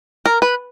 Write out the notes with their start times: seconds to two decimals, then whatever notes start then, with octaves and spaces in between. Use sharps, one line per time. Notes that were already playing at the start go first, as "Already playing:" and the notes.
0.26 A#4
0.42 B4